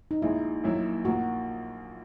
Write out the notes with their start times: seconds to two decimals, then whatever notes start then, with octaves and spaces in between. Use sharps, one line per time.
0.11 D#4
0.22 A#1 A#2 G#3 E4
0.64 A#1 A#2 F#3 A#3 E4
1.05 A#1 A#2 A#3 F#4